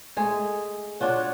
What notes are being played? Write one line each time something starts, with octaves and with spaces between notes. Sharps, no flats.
G#3 A3 G#4
D4 F4 F#4 C#5